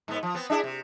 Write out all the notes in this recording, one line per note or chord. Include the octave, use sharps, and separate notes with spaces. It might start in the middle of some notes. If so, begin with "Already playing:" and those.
G#2 B3
F3
B3 C4
D4 E4 G#4
C3